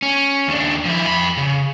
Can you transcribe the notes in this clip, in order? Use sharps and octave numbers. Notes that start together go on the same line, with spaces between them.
C#4
D#2 D4
F3 E4
F2 B5
C#3